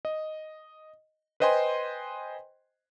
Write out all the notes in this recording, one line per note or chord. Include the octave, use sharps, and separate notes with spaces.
D#5
B4 C5 D#5 G5 G#5 C6